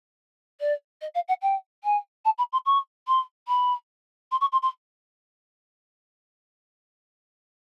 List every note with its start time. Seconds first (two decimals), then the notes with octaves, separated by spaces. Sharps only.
0.60 D5
1.01 D#5
1.15 F5
1.28 F#5
1.42 G5
1.84 G#5
2.25 A5
2.38 B5
2.52 C6
2.66 C#6
3.08 C6
3.48 B5
4.31 C6
4.41 C#6
4.52 C6
4.62 C6